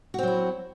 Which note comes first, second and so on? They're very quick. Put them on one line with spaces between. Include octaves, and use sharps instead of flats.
F#4 C4 F#3 E4